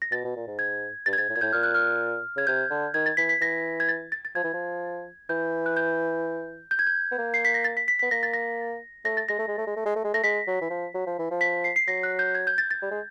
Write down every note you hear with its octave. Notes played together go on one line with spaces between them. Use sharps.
A#6
B2 A6
B2
A#2
G#2
G#6
G2 A6
G#6
G#2 A6
A2
A#2 G#6
A2 G6
A#2 F6
F#6
F6
C#3 G#6
C3 G6
D3
D#3 G#6
A6
E3 B6
B6
E3 A#6
G#6
A6
A6
A6
F3 G#6
E3
F3
E3 G6
F#6
G6
G6
G#6
G6
B3
A#3
C7
B6
A#6
A6
B6
B6
B3 B6
A#3 A#6
A6
A#6
A3 A#6
A6
G#3 A#6
A3
G#3
A3
G#3
A3
G#3
A3
G#3
A3 A#6
G#3 B6
F#3
E3
F3
F#3
F3
E3
F3
B6
C7
C7
F#3 A#6
F#6
G6
G#6
G6
A6
A6
G3
G#3